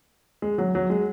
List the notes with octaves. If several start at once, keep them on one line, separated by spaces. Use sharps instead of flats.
G#3
F#3
F#3
G#3